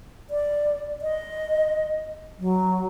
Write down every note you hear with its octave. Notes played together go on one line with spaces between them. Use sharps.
D5
D#5
F#3